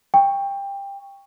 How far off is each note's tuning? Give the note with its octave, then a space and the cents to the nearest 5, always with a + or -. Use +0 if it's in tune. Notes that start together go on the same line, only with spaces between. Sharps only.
G5 +20 C#6 +0